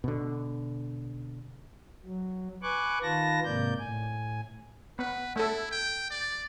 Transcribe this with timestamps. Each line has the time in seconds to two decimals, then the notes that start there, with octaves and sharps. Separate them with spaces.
0.04 B2 D3
2.05 F#3
2.63 B4 G#5 C#6 D6 F#6
3.03 D#3 F4 B4 A5 A#6
3.44 G#2 C3 A#3 D5 G6
3.79 A2 G#5
4.99 B3 B4
5.36 A3 E4 A4
5.71 G5
6.10 D5